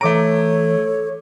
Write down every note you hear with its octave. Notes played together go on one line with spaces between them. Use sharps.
E3 A3 A4 C#5 A#5 D6 D7